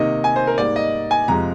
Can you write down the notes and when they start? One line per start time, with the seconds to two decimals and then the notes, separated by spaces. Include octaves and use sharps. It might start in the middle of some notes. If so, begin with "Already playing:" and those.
Already playing: C3 D#3 A#3 D#5
0.24 G#5
0.36 C5
0.47 A#4
0.58 G#2 G3 A#3 D5
0.76 D#5
1.11 G#5
1.28 F2 C3 F3 G#3 A#5